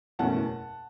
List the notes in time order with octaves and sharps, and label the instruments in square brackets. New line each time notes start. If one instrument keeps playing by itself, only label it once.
[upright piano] F#1 E2 B2 A3 C#4 F#5 A5